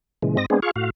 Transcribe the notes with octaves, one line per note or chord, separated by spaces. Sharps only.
A#2 C#3 E3 G#3
G#2 C4 D#5 A#6
G#3 B3 C4 D4 G#4
F4 G#4 F5 C#6
A2 F#4 F5